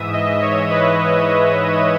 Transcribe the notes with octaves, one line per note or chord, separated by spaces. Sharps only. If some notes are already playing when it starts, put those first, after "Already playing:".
Already playing: G#2 E3 E5 D#6
D#5
C#5
B4